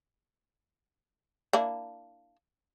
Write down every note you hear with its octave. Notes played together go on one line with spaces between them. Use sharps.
A#3 D4 E4